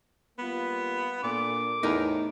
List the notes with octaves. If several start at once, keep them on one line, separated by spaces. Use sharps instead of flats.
G3 A#3 B3 F4
A#2 D4 A4 A#4 D6
E2 A2 D#4 A#4